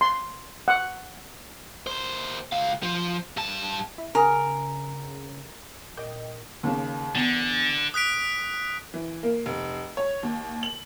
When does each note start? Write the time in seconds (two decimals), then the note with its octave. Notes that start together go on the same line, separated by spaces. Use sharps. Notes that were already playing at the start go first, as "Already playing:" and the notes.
0.01 C6
0.68 F#5
1.87 D#2 C5
2.52 C#2 F5
2.83 F3
3.37 G2 A5
3.98 E4
4.15 C#3 A#4 G#5 D#6 F6
5.97 A#2 D#5 G5
6.63 D#2 C#3
7.15 E2 D3
7.94 D#6 F#6 B6 D7
8.94 E3
9.23 A#3
9.46 F1
9.97 C#5
10.23 D#2
10.63 F#7